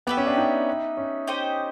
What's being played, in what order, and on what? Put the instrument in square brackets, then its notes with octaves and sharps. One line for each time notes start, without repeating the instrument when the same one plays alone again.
[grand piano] B3 [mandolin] G4 B4 E5
[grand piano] C#4
D4
D#4
C#4
[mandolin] D#4 G4 C5 D#5